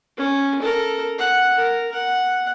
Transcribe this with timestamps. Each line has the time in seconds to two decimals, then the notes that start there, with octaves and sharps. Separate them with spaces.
0.18 C#4
0.62 A4 A#4
1.19 F#5
1.56 A#4
1.94 F#5